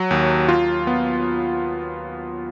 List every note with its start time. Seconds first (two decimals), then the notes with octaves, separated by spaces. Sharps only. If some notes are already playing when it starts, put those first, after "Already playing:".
Already playing: F#3
0.11 D#2
0.48 F4
0.87 B3